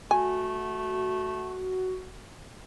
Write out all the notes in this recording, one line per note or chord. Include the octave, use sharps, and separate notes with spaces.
A3 F#4 G#5